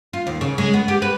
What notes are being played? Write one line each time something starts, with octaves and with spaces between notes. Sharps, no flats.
F4
D#2
C#3
G#3
B3
G4
B4